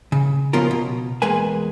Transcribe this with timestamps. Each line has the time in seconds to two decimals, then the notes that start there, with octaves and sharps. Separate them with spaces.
0.12 C#3
0.53 B2 F3 B3 C#4 F4 A#4
0.71 B2
1.22 E2 G#3 A#3 B4 G#5